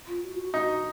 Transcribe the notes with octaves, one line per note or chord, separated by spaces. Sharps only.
F4
F#4
F4
F#4
D#4 F#4